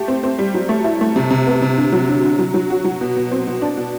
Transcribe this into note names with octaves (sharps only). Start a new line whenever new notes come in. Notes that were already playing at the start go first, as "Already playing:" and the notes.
Already playing: A3 G4
C4
C4
G3
F#3
A3
E4
A3
C3
C3
B3
C3
D3
F#3
D3
D3
F#3
F#3
F#4
F#3
B2
B2
C4
B2
D4
B2